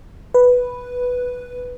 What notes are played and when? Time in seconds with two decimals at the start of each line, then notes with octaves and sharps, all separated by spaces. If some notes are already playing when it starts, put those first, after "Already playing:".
0.34 B4